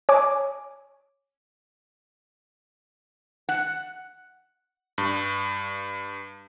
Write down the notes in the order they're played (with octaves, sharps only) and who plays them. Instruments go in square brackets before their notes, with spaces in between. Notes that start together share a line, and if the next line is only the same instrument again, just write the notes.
[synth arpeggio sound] C#5 G#5 D6
[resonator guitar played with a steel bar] F#5
[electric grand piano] G2